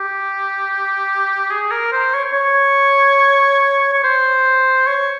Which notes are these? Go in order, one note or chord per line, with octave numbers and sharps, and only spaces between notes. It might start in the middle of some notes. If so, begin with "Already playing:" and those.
Already playing: G4
G#4
A#4
C5
C#5
C#5
C#5
C5
C#5